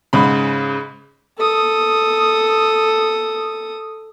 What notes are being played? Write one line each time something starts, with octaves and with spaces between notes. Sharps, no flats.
G#2 C#3 B5
A4 D#6